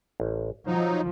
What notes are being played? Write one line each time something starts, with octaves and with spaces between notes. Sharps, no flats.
A1
F3 F#3 D#4 C5 A5